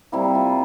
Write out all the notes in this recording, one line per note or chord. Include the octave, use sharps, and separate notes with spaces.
C3 G3 A#3 E4
F4